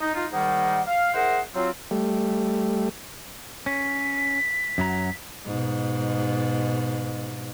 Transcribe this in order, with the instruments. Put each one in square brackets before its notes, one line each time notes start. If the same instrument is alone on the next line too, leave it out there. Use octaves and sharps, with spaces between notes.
[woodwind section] D#4
D#4 F4
G#2 D#3 G3 A#3 D#4 F#5
F5
E4 G#4 A#4 C5 F#5
F#3 C4 F4
[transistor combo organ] G3 A3
[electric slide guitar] C#4 [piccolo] B6
[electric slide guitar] F#2 F#3 A#5
[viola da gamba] G#2 B2